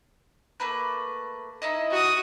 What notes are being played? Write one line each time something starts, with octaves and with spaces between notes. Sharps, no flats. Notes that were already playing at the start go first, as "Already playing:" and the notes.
A3 A#3 B4
D#4 E4 D#5
F#4 D#6